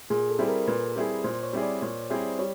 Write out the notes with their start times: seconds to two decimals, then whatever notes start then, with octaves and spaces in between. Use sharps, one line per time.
0.10 A#2 G#4
0.30 A4
0.39 G3 C4 E4 G#4
0.48 A#4
0.67 A#2 B4
0.96 G3 C4 E4 G#4
1.24 A#2 C5
1.43 C#5
1.53 G3 C4 E4 G#4
1.62 D5
1.82 A#2 C#5
2.10 G3 C4 E4 G#4
2.39 G3 C#5